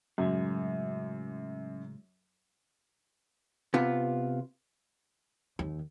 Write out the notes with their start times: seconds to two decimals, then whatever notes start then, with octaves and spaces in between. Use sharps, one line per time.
0.18 F#2 A2 C#3 G#3
3.74 C3 B3 F4
5.59 D#2